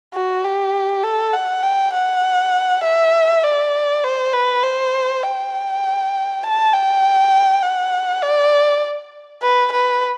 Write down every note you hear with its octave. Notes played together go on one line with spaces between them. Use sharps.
F#4
G4
A4
F#5
G5
F#5
E5
D5
C5
B4
C5
G5
A5
G5
F#5
D5
B4
B4